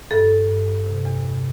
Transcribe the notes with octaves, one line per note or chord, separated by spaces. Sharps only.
G2 A4
G2
G2
G2
C3
E2
C3